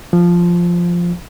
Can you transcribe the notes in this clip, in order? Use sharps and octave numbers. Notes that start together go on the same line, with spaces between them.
F3